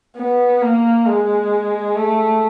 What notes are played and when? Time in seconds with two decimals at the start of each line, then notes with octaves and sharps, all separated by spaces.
0.17 B3
0.62 A#3
1.06 G#3
1.96 A3